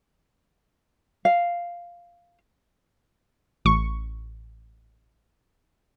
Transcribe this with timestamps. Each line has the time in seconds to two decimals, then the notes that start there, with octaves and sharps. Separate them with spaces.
1.25 F5
3.65 A1 C#6